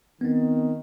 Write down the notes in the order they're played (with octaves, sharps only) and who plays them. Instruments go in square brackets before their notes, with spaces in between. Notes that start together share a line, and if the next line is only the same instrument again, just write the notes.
[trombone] D#3 [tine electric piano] B3 C4